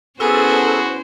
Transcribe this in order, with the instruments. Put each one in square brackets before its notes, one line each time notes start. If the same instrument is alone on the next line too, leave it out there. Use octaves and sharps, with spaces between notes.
[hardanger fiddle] B3 G#4 [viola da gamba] C#4 E4 C5 [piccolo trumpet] F#4 [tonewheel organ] A4